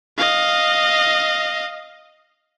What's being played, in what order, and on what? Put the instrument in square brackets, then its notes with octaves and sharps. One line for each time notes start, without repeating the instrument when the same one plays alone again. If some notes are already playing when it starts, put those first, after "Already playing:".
[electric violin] D#5 F5